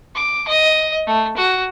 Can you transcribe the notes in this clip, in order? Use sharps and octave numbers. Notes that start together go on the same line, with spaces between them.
D6
D#5
A3
F#4